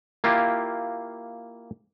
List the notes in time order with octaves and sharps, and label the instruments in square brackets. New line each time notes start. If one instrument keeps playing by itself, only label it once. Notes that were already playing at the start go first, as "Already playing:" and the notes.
[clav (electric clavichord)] A#3 E4 F4 G4